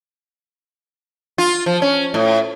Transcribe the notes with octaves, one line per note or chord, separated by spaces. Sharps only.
F4
F3
C#4
A2